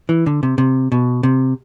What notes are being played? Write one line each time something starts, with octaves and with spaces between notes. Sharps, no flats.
E3
D3
C3
C3
B2
C3